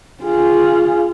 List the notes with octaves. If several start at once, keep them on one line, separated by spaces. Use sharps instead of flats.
F4 G#4